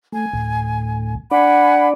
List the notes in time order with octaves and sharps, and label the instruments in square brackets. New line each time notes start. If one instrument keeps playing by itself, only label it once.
[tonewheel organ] A3 [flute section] G#5
[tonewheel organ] D2 A2
[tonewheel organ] D4 D5 [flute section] F#5 G#5 B5